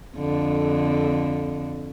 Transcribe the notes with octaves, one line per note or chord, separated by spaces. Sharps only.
F2 D3